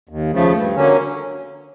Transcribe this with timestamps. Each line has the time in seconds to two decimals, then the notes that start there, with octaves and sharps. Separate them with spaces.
0.09 D#2
0.31 C#3 F3 A3
0.52 G2
0.75 D3 F#3 A#3 C#4